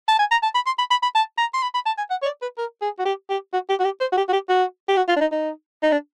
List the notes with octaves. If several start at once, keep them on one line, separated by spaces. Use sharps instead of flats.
A5
G#5
A#5
A5
B5
C6
B5
B5
B5
A5
A#5
C6
B5
B5
A5
G#5
F#5
C#5
D5
B4
A#4
G#4
F#4
G4
G4
F#4
G4
F#4
G4
C5
F#4
G4
F#4
G4
F#4
G4
F#4
F4
D4
D#4
D#4
D#4
D4